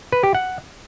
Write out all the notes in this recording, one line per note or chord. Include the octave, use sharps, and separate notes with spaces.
B4
G4
F#5